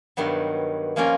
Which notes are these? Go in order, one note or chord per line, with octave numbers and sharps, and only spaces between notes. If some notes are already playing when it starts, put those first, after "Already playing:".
G2 D#3 F#3 B3
F3 A#3 C#4 F4 A#4